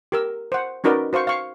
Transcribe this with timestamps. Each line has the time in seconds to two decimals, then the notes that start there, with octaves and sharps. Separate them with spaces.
0.12 G4 A#4 E6
0.52 C5 F#5
0.84 C#4 D#4 F#4 A#4 B4 D5
1.13 F#4 C5 F5 C#6
1.27 F5 C#6